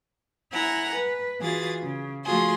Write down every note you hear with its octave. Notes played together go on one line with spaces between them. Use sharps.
E4 F#5 G#5 A#5
B4
E3 F4 F#4 G#4 A6
C#3
F3 A3 F4 F#4 G#4 C6